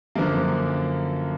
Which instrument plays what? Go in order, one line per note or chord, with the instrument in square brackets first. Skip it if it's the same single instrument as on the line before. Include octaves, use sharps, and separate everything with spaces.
[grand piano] F#2 D3 F3 A#3